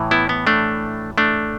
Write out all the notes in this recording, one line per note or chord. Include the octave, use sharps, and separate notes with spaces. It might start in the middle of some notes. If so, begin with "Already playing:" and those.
Already playing: A2 E3
B3 E4
B3
A3 D4
A3 D4